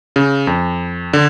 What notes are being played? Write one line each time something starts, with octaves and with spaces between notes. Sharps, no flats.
C#3
F2
D3